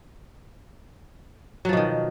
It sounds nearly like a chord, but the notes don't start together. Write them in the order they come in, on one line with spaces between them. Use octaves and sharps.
F#3 F3 B2 D#3